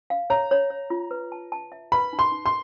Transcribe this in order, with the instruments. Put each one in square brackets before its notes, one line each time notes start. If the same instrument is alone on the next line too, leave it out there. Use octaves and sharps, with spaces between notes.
[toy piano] F5
[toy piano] C#5 [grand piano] A#5
[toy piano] C#5
C#5
F4
B4
A5
A5
E5
[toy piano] B4 [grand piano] B5
[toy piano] D#4
[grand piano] C6
[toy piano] D#4
[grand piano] C6